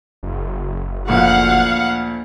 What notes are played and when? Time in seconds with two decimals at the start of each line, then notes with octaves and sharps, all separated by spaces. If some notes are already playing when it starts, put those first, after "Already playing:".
0.23 F#1
1.08 D2 A#2 F3 F5 F#5